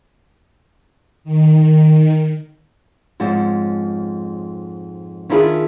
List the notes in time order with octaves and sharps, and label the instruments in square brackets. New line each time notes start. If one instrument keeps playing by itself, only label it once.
[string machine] D#3
[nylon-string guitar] F2 G#2 C#4
D#3 C#4 D4 E4 F4 G#4